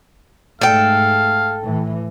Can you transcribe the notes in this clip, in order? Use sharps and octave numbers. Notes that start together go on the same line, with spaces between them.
G#2 A3 A4 F5 G5
A2 E3